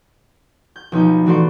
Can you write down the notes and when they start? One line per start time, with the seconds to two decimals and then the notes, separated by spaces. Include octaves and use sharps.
0.76 G6
0.92 B1 F3 D#4 G6
1.26 E3 A3 F#4 D5 C6 C7